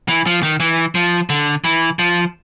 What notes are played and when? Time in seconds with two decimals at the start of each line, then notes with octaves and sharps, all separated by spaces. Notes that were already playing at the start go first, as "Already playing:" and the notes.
0.09 E3
0.26 F3
0.43 D#3
0.60 E3
0.95 F3
1.30 D3
1.64 E3
1.99 F3